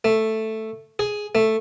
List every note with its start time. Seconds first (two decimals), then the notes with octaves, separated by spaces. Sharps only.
0.04 A3
0.99 G#4
1.35 A3